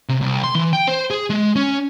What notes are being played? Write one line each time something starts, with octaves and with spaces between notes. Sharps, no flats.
C3
C2
C6
E3
G5
C5
G#4
G#3
C#4